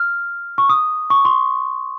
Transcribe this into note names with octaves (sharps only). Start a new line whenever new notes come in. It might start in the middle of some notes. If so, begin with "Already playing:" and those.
Already playing: F6
C#6
D#6
C#6
C6